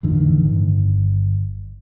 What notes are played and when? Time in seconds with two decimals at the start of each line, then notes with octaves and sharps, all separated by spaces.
0.03 A1 F2 D3 D#3
0.43 G1